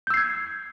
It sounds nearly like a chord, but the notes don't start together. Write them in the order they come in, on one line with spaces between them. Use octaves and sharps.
G6 E6 C7 G#6